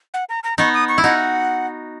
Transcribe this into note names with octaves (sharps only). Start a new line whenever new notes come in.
F#5
A#5
A#5
B3 D#4 C#6
D#6
C#6
E4
D#4 F#4 F#5